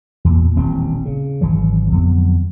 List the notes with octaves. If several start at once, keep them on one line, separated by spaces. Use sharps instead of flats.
E2 A#2
D#1 A1 C4
C#3
G#1 E3 F#3
F2 D3 F#3 B3